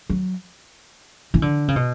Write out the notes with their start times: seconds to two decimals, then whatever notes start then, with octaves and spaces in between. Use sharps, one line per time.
0.10 F#3
1.34 E3
1.42 D3
1.68 C#3
1.76 B2